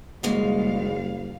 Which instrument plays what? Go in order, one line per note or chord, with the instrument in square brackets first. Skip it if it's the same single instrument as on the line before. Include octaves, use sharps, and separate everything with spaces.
[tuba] F#1 [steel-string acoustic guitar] D#2 G#2 G#3 [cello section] G3 F5